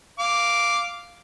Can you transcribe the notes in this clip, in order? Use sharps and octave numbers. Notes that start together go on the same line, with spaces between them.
F5 D6